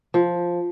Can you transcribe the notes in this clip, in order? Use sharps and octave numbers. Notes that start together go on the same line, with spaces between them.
F3